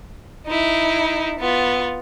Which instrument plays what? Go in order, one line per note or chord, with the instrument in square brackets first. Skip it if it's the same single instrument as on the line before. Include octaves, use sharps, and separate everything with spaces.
[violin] D#4 E4
B3 F4